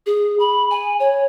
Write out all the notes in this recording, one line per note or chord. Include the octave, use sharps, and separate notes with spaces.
G#4
B5
G#5
C#5